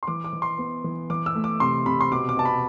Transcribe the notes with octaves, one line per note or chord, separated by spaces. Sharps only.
C6
E3 D6
D6
E3
C6
B3
E3
E3 D6
E6
A3
D6
C3 C6
C3 B5
C6
B2 D6
D6
B2 A5
B5